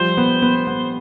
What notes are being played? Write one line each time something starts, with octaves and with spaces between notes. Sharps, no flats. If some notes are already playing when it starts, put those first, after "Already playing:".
Already playing: F3 G3 C5
B3
B3
B3